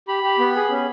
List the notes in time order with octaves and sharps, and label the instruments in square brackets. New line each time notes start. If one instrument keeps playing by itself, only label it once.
[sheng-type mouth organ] G4 B5
G4
B3
G#4
C#4